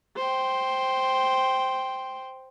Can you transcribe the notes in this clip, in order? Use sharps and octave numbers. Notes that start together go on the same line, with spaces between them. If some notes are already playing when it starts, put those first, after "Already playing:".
C5 G5